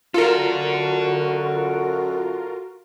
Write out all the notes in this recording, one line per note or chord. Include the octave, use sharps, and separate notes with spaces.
F#2 F4 F#4 A4 A#4 D5